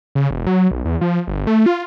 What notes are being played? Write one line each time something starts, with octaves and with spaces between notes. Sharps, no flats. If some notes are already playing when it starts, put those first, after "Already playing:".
C#3
E1
F#3
B1
E2
F3
G1
A3
F4